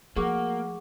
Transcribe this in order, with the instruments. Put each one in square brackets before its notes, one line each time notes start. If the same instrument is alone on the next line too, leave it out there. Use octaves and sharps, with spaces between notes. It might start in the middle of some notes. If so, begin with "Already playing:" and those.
[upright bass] F3 A3 [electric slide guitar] A#3 [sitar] F#4 [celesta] G#4 C#6 D6